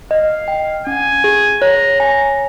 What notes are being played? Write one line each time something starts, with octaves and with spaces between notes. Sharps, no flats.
D#5 F5
G5
C#4 G#5
G#4
C#5 A#5
G#5 A#5